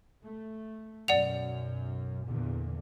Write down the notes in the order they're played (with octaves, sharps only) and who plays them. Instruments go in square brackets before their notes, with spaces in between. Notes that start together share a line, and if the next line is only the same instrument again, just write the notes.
[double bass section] A3
[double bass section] B1 F#2 [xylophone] D5 F#5 F7
[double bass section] E2 A#2 D3